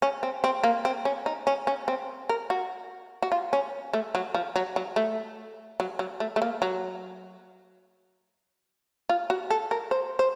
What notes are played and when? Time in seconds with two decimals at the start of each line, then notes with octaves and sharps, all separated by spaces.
0.02 C#4
0.23 C4
0.44 C4
0.63 A#3
0.85 C4
1.05 C#4
1.26 D#4
1.47 C#4
1.67 C#4
1.88 C4
2.29 A#4
2.50 F#4
3.22 F#4
3.32 F4
3.53 C#4
3.93 A3
4.15 F#3
4.34 F3
4.56 F#3
4.76 F#3
4.96 A3
5.80 F#3
5.99 F#3
6.20 A3
6.36 A3
6.42 A#3
6.62 F#3
9.09 F4
9.30 F#4
9.50 A4
9.71 A#4
9.91 C5
10.19 C5